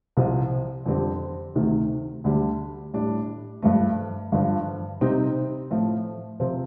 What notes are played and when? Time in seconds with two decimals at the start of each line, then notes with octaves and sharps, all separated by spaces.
0.17 C2 C3 F3 C4
0.86 F2 D3 G3 C4
1.56 D2 C3 D#3 A3
2.24 D2 D3 G3
2.94 A2 G3 D4
3.62 G2 F3 A3
4.32 G2 D3 F3
5.01 C3 G3 C4 D#4
5.70 A2 F3 A3
6.40 C3 F3 C4